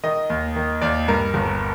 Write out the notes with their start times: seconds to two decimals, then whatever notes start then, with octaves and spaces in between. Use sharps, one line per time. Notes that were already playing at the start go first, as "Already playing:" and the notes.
0.04 D#3 D#5
0.30 D#2
0.56 D#3
0.82 D#2 D5
1.08 G2 A#4
1.34 G1